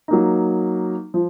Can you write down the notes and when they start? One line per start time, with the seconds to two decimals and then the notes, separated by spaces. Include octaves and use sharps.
0.08 F#3 A#3 D#4
1.14 F3